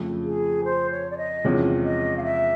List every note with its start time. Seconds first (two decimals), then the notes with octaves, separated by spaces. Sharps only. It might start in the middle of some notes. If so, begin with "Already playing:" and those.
Already playing: F2 C#3 F3 A3
0.25 G#4
0.64 C5
0.91 C#5
1.11 D5
1.18 D#5
1.44 E2 C3 F3 G#3 C#4
1.84 D#5
2.17 F5
2.24 E5